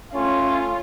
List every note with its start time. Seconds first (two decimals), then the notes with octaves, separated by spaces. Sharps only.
0.13 A3 C#4 F4